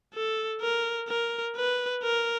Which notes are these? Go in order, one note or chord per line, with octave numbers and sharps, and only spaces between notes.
A4
A#4
A#4
B4
A#4